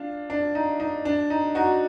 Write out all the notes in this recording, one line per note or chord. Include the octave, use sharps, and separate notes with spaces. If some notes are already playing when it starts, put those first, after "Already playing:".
Already playing: D4 F4
D4
D#4
D#4
D4
D#4
D#4 F#4